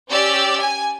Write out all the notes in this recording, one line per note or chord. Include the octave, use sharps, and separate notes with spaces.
C#4 G4 D5 E6
G#5